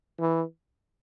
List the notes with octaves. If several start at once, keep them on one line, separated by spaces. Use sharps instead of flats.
E3